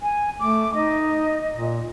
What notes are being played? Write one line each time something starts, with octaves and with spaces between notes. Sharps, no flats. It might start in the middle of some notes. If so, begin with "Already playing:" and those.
G#5
A3 D6
D#4 D#5
A#2